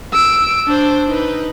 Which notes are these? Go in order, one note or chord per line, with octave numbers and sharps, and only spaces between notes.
E6 D7
D4 C5
D#4 B4